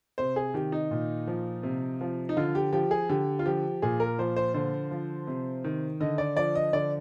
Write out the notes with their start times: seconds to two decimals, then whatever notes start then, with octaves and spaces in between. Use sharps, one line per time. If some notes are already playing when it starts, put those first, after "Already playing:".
0.18 C3 C5
0.36 G#4
0.54 D#3 G4
0.72 D#4
0.91 A#2
1.27 F3
1.63 C3
2.01 F3
2.29 D#4
2.37 D3 F4
2.55 G4
2.73 F3 G4
2.91 G#4
3.09 D3 G4
3.39 F4
3.46 F3 G4
3.82 A#2 G#4
4.00 A#4
4.19 F3 C5
4.36 C5
4.54 D3 C5
4.91 F3
5.27 C3
5.64 D#3
6.00 D3 D#5
6.18 D5
6.37 F3 D5
6.55 D#5
6.73 D3 D5